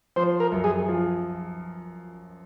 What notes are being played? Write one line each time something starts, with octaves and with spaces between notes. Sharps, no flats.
F3 C5
A#4
F#2
G#4
F3